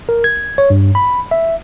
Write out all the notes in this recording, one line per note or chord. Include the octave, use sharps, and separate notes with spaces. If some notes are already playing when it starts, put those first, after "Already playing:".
A#4
G#6
C#5
G2
B5
E5